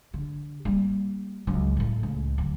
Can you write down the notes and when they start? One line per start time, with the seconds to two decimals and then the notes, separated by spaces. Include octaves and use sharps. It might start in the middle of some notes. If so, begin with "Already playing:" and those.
0.14 D3
0.65 G3 A#3
1.47 C#2 F#3
1.77 A2 A3
2.03 C#2
2.38 D2 F#3